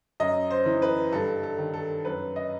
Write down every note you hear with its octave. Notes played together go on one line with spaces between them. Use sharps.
F#2 D#5
C5
E3
B4
G2 A4
A4
D#3
A4
F#2 B4
D#5